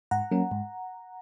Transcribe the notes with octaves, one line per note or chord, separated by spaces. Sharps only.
G#2 F#5 A#5
F#3 A#3 C#4
G#2